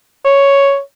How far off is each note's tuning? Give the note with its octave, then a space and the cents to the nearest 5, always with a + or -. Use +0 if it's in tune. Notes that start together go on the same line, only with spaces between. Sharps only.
C#5 +5